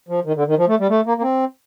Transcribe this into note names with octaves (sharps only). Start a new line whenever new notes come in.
F3
D#3
D3
D#3
F3
A3
G3
A3
A#3
A#3
C4